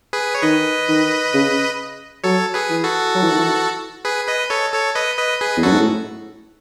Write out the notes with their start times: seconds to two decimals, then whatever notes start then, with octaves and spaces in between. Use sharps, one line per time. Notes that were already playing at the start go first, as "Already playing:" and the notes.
0.13 G#4 B4
0.35 C#5
0.43 D#3 B4 D#5
0.88 D#3
1.34 C#3
2.24 F#3 A4 C#5
2.54 G#4 B4
2.70 E3
2.84 F#4 A4
3.15 F#3
3.22 E3
3.31 D#3
3.39 E3
4.05 G#4 B4
4.27 B4 D#5
4.50 A4 C#5
4.74 A4 C#5
4.95 B4 D#5
5.18 B4 D#5
5.41 G#4 B4
5.57 E2
5.63 F#2 F#4 A4
5.72 G#2
5.80 A2